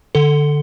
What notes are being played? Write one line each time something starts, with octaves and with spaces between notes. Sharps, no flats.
D3 A4